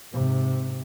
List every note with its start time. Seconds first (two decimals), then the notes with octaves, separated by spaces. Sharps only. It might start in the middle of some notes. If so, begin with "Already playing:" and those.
0.12 G#2 C3